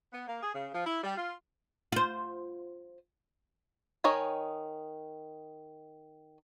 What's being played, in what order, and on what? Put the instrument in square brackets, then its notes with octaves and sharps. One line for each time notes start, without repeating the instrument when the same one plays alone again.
[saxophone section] B3
A#3
G#4
C#3
F3
E4
G3
F4
[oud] F4 C5
[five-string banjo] D#3 C#5 D#5 G#5